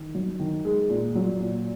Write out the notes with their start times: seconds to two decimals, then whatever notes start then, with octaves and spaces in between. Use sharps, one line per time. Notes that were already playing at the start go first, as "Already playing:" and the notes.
Already playing: D#3
0.15 F#3
0.39 D#3
0.65 G#3
0.89 A#2
1.15 F#3
1.40 A#2